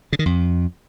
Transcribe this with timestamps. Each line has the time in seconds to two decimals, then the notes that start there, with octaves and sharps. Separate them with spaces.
0.13 C#3
0.19 D#3
0.26 F2